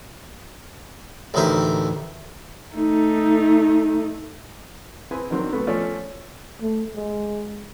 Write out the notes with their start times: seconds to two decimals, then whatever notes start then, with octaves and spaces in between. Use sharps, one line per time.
1.34 A1 D2 D#3 C5 E5
2.75 A3 D#4
5.11 C4 E4 G#4 B4 G#5
5.31 D#3 F#3 C4 D4 F#4 A#4
5.53 C3 A3 B3
5.67 F3 A3 C#4 C#5 D5
6.61 A3
6.96 G#3